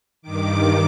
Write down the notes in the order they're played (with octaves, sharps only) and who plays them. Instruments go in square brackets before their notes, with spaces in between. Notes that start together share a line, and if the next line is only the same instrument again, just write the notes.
[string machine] G2 D#3 D6